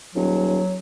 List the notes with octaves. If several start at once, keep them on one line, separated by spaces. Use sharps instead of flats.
D#1 F#3